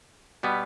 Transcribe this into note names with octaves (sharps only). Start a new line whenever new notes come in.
B2 G3 B3